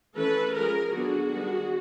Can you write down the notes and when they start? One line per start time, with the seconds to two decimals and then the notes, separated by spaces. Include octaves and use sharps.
0.16 E3 A3 C#4 A4 B4
0.54 F3 G#3 C#4 G#4 A#4
0.93 D3 F#3 B3 D4 F#4 G#4
1.31 D#3 G3 B3 D4